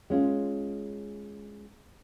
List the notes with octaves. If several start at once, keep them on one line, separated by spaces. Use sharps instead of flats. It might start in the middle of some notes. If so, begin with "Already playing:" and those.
G#3 C#4 F4